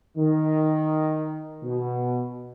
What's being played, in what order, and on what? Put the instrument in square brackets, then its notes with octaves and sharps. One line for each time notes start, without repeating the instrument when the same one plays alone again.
[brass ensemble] D#3
B2